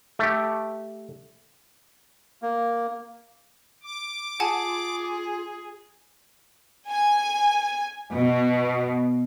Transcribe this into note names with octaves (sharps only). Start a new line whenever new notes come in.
A3 G4
A#3
D6
F4 G#4 F#5 G#5 A5
G#5
B2